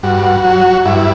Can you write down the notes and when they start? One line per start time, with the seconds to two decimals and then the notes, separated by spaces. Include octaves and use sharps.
0.03 G2 F#4
0.45 F#3
0.85 G2 E4